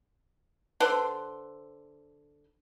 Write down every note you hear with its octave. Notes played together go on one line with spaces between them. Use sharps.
D3 B4 C5 C6